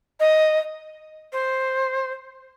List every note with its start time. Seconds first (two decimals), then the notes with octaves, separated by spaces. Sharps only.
0.20 D#5
1.32 C5